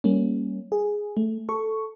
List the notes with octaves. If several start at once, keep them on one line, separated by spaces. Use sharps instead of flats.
G3 A#3 C#4
G#4
A3
A4 C#6